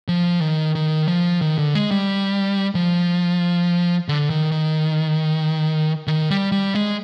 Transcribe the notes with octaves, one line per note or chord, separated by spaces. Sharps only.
F3
D#3
D#3
F3
D#3
D3
G#3
G3
F3
D3
D#3
D#3
D#3
G3
G3
G#3